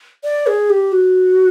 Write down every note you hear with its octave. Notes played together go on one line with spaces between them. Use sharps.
D5
G#4
G4
F#4